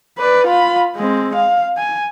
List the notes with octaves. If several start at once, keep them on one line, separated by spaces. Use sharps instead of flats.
B4 D5
F4 B5
G#3 C4
F5
G#5